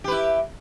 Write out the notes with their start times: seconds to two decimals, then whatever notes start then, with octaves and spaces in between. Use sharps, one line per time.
0.04 G4
0.08 B4
0.11 E4